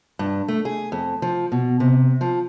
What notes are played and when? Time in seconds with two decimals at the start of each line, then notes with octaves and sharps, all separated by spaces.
0.19 G2
0.48 A3
0.65 G#4
0.92 F2
1.22 F3
1.52 B2
1.80 C3
2.21 F3